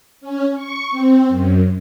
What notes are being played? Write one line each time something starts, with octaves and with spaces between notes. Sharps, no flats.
C#4
C#6
C4
F#2